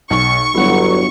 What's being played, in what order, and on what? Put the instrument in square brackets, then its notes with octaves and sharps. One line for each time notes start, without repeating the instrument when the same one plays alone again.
[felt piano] B1 [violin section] C#6
[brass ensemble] G1 F#3 [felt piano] E4 F#5